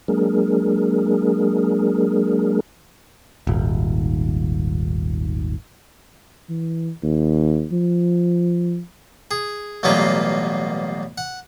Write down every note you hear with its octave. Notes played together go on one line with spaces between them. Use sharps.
F#3 G#3 A#3 D4 G#4 A#4
D#1 G#1
E3
D#2
F3
G#4
A1 B2 F#3 G3 A#3 F4
F#5